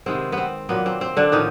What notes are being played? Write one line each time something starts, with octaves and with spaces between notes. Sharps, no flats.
C3 D#3 G#3 B3 C4
B3
C4
A#2 F#3 A#3 B3
C4
C4
D3 D4
A2 D#3 F3 D#4